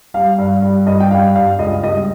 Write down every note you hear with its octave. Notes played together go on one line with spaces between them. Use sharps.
G3 F5
G2
G3
G2 D#5
G5
G3 F5
G2 F5
C#2 D#5
G3 D#5